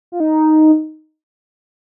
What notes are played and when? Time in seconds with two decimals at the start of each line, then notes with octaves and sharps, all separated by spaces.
0.12 F4
0.20 D#4